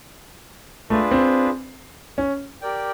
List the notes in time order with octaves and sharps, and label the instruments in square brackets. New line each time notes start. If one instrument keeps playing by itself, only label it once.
[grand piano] A3 [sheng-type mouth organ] D4 F4 G#4 B4
[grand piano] C4
C#4
[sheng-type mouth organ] G4 A#4 D5 G5